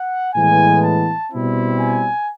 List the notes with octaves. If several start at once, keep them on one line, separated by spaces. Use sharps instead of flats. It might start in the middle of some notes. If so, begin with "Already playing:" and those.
Already playing: F#5
A2 E3 G#3 B3 G#5
A5
B2 G3 C4 E4
G#5